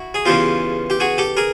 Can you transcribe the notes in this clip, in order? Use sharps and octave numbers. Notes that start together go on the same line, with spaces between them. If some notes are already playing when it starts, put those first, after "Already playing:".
Already playing: E4 F#4
G#4
E2 C#3 E3 F4 G4
G4
F#4 G#4
G4 A4
G#4 A#4